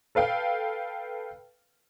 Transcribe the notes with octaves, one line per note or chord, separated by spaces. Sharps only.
A4 B4 F5 G5